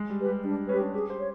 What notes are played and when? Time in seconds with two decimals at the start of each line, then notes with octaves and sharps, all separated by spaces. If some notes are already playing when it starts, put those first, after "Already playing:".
Already playing: G#3
0.10 G3
0.18 G4 B4
0.26 G3
0.43 G3 D4
0.68 C#4 G4 B4
0.81 D4
0.93 G4 G#4
1.10 C5
1.18 C#5